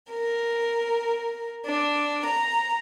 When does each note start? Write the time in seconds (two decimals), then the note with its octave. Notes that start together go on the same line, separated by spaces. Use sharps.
0.10 A#4
1.67 D4
2.25 A#5